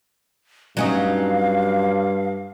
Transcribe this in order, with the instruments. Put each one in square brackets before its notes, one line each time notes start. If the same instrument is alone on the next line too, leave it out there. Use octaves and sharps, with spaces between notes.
[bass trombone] G2 [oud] F#3 C#4 D#4 [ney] F5